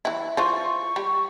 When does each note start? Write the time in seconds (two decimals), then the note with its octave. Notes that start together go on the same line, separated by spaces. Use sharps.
0.05 E3 E4
0.37 E3 F4 C5 C#6
0.96 G3